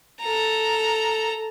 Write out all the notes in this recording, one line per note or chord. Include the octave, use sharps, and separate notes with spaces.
A4 A#5